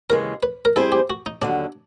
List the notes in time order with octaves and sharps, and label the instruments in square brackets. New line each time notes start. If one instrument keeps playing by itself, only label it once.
[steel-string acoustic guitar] D#2 C#3 E3 G#3 [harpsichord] A#4
[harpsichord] B4
A#4
[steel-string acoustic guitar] G3 C4 E4 G#4 C5 [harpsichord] A4
[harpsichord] G4
F#4
D#4
[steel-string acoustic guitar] D#2 D3 F#3 [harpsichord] D4